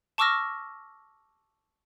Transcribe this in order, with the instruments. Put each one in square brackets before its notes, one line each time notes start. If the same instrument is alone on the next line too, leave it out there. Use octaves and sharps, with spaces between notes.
[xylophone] A5 C#6 D6 E6 F6 A#6